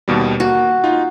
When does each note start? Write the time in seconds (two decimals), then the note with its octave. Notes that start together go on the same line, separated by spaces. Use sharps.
0.08 D#2 B2 G3
0.40 A#3 F#4
0.84 D#4 F4